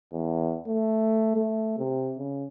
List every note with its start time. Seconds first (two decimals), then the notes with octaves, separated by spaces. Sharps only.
0.12 E2
0.67 A3
1.36 A3
1.78 C3
2.18 C#3